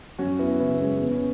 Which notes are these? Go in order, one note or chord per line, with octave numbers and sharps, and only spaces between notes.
F#2 C#4 F#4
B3 E4
C#3 E3 B3 E4
B3
G#3 C#4
G#3
E2 B3
C#4